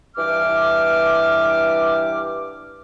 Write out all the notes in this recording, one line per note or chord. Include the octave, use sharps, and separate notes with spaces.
G2 E3 D6 F6